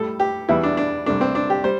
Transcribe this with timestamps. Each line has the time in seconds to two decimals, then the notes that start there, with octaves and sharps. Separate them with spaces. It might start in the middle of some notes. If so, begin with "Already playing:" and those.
Already playing: A2 G3 A4
0.20 G4
0.49 E2 E3 G3 E4
0.63 D4
0.77 D4
1.06 C2 C3 A3 D4
1.21 C4
1.35 D4
1.50 G4
1.64 G3 C5